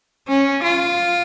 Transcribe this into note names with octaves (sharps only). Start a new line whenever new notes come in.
C#4
F4